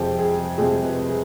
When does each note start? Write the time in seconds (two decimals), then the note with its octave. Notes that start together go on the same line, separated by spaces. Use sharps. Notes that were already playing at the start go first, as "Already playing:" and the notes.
Already playing: F2 C3 F3 G#3 G5
0.19 G#4
0.58 F2 C3 F3 G#3 G#4
0.84 B4
1.09 G#4